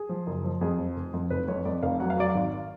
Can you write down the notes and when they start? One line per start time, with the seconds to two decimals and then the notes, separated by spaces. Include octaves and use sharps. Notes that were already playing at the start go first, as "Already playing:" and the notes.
Already playing: G#4
0.09 F3
0.27 F#1
0.44 F3
0.61 F2 G#4
0.79 F3
0.97 F1
1.13 F2
1.30 F1 B4
1.48 F2 C#5
1.65 F2 D5
1.83 F1 F5
2.00 F#3 F#5
2.10 F5
2.17 F#3 D5
2.30 G#1 F5